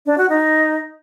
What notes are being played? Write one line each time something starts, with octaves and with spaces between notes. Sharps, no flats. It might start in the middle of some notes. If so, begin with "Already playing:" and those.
D4
F#4
D#4